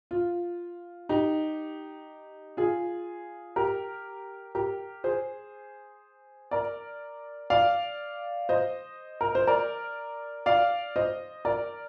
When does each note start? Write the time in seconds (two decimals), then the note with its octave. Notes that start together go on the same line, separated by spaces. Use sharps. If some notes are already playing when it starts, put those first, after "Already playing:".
0.11 F4
1.09 D#4 G4
2.57 F4 G#4
3.56 G4 A#4
4.55 G4 A#4
5.04 G#4 C5
6.51 A#4 D5
7.50 D5 F5
8.49 C5 D#5
9.21 A#4
9.35 C5
9.47 A#4 D5
10.46 D5 F5
10.96 C5 D#5
11.45 A#4 D5